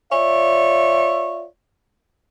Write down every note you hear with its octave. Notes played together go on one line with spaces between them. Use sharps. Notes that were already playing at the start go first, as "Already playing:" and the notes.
F4 C#5 D5 E5